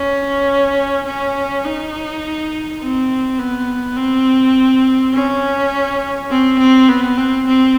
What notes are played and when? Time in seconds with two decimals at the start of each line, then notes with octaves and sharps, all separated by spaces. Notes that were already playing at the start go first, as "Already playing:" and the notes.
Already playing: C#4
1.06 C#4
1.65 D#4
2.81 C4
3.39 B3
3.97 C4
5.13 C#4
6.30 C4
6.58 C4
6.89 B3
7.17 C4
7.47 C4